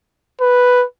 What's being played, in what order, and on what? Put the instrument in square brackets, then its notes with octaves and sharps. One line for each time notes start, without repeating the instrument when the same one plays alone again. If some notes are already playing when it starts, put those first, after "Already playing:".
[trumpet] B4